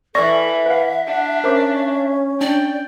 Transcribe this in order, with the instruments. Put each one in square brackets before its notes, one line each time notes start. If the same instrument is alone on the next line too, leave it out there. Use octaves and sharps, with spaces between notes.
[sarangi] E3 [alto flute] A4 [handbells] D5 C#6 A#6 [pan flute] E5
[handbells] B4 F5 [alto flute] F#5
[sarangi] D4
[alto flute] C#4 [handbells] A#4 C5 D6
[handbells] D4 [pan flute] D5 [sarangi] G5